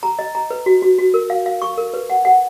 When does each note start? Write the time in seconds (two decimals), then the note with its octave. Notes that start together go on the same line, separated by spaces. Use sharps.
0.03 A#5
0.19 D#5
0.35 A#5
0.51 B4
0.66 F#4
0.82 F#4
0.98 F#4
1.14 A#4
1.30 F5
1.46 F5
1.62 C#6
1.78 A#4
1.94 B4
2.10 F#5
2.25 F#5